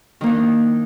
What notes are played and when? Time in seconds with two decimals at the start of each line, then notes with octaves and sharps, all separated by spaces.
0.21 D#3
0.24 A#3
0.26 D#4
0.29 D4